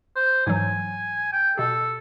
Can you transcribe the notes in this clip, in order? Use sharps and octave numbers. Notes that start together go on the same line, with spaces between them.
C5
G#2 E3 F#3 G#5
G5
B2 G4 A4